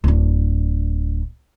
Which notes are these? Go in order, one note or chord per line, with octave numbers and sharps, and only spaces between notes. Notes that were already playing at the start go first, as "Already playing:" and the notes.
D1 D4